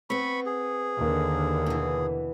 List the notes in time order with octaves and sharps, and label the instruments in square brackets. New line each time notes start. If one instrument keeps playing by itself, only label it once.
[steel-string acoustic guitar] B3 C4 [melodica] B5 C#6
[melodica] G#4
[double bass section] D#2 D3
[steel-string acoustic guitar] B2 E3